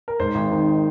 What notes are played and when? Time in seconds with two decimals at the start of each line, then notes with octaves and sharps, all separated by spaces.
0.08 A#4
0.20 G#2 C5
0.35 G#1
0.51 D#3